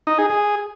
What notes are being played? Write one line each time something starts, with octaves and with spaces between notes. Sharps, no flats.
D#4
G#4
G#4